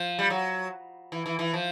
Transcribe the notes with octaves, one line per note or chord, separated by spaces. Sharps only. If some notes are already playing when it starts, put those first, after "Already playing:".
Already playing: F3
G3
F#3
E3
E3
E3
F3